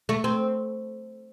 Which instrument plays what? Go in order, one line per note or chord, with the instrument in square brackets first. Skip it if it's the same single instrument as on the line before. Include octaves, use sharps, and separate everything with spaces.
[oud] A3
C4